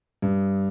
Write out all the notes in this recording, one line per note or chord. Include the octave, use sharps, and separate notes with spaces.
G2